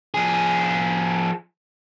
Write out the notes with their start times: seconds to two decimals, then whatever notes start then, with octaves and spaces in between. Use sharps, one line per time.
0.14 F3 G#4